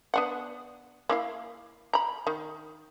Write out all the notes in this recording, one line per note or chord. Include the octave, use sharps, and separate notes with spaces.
B3 D4 F#5
A#3 E4 F5
A#5 B5
D#3